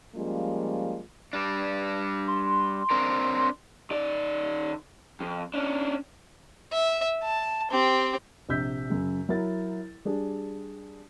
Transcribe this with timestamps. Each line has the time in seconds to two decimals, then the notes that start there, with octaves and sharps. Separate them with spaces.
0.15 F3 G3 G#3 A#3 C#4 F4
1.33 G3 D4
2.28 C6
2.90 C4 D4 A#4
3.91 D#3 D5
5.21 F2
5.54 C#4 D4
6.73 E5
7.23 A5
7.71 C4 G4
8.49 A#1 C3 E6 G6 B6
8.90 F#2 C#3
9.29 F#3 E4 A#4 A6
10.05 G3 D4 G#4